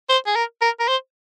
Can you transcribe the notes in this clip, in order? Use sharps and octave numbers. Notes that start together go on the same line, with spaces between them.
C5
G#4
A#4
A#4
A#4
C5